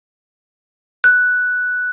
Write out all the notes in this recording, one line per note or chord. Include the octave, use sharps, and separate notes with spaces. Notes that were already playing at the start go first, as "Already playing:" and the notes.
F#6